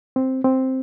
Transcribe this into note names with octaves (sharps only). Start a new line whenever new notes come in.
C4
C4